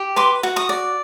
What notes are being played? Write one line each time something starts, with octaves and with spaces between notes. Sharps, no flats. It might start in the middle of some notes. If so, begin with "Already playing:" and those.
Already playing: G4
B4 C6 D6
F#4
C#6 D#6
D5